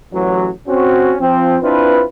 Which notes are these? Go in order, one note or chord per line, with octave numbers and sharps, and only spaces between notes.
A1 E3 F#3
C4 C#4 F#4
F3 C4
C4 D4 E4 F4 B4